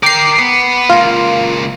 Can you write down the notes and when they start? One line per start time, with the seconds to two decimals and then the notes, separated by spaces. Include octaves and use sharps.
0.03 A#4 G5 D6 C7
0.39 B3
0.89 C#2 A#3 F4